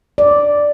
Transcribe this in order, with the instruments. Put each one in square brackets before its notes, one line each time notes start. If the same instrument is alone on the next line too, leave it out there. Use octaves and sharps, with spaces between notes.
[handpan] D5